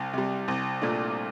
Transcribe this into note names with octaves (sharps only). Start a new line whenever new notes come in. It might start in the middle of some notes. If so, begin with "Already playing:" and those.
Already playing: C2
C3 G3
C2
A#2 A3 D4